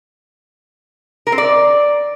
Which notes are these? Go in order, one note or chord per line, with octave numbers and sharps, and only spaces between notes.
A#4
C4
D5